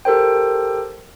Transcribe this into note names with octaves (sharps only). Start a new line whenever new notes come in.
G4 A4 A#4 C5 G5